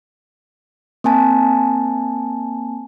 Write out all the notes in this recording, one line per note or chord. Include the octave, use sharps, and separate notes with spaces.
A#3 C4 G#5 A5